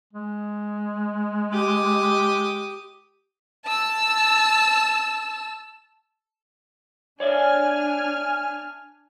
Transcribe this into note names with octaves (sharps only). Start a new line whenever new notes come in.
G#3
G4 D6 D#6
A5 E6
D4 C#5 D5 E5 G#5 F6